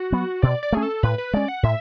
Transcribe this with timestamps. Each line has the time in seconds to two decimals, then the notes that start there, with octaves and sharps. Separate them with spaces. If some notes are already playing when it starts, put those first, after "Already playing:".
Already playing: F#4
0.12 F#3 B3
0.42 B2 D5
0.63 D5
0.72 A3 C#4 G#4
0.83 A4
1.03 A2 B4
1.18 B4
1.34 G#3 C#4 D5
1.48 F#5
1.63 A2 E5